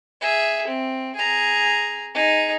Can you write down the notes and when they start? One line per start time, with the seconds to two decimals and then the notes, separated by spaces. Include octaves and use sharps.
0.21 G#4 E5
0.67 C4
1.16 G#4 A#5
2.14 D#4 G#4